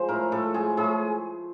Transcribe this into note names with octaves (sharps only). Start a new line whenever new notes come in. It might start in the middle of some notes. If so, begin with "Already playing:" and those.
Already playing: F3 G#3 C5
A2 A#4
A2 A4
G#3 G#4
A2 G#4